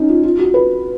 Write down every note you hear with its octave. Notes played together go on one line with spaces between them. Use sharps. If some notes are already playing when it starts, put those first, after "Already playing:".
Already playing: C#4 D#4
F4
F4
F#4
B4